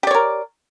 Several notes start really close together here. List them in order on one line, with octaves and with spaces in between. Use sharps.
G4 D5 C#5 A#4